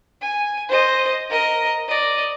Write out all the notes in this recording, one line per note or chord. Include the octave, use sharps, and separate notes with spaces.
G#5
C5 D#5
A#4 D#5
D5 D#5